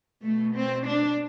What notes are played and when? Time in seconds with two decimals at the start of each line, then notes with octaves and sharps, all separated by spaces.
0.24 B2 A3
0.55 C4
0.86 D4